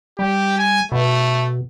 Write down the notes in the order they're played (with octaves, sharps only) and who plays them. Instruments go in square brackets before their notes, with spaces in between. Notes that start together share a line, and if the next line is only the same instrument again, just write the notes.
[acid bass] G3 [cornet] G4
[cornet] G#5
[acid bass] B2 [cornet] A3